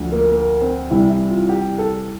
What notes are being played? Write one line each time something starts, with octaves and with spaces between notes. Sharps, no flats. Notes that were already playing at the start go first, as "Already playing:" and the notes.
Already playing: D2 D3 F3
A#3
A#3
C4
C2 C3 E3 G3 E4
E4
F4
G4
A4